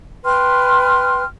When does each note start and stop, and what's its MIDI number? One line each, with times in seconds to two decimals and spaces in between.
0.24 1.23 71
0.24 1.23 79
0.24 1.23 84
0.24 1.23 89